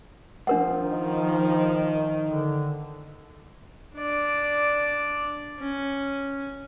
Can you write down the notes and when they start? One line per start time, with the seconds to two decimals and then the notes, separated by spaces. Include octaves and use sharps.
0.47 F3 D4 A#4 F#5
0.81 D#3
2.24 D3
3.95 D4 D5
5.59 C#4